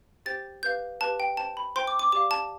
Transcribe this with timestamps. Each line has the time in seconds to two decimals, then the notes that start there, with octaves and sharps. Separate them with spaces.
0.26 G4 C5 G5 A6
0.63 G4 B4 F5 G6
1.00 G4 B4 F5 A5
1.20 G5
1.37 C5 G5 A5
1.57 B5
1.76 C5 G5 C6
1.87 D6
1.99 D6
2.12 G4 D5 F5 D6
2.31 A5